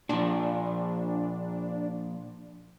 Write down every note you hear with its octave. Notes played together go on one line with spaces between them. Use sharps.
A#2 F3 D4